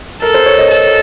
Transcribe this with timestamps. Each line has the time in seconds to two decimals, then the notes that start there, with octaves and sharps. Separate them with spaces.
0.22 A4 A#4
0.34 C5
0.46 C#5
0.58 D#5
0.70 A4